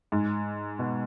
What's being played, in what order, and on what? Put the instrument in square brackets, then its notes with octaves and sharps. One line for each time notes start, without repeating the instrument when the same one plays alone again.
[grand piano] G#2
B2